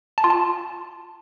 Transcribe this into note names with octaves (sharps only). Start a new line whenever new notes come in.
A5
F4
A5